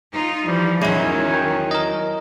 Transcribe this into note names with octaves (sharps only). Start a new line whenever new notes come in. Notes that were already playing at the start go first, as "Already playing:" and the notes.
D#4 F4
E3 F3 G3
E2 D#3 F#3 G#3 C#4 E4
G5
A#4 D#5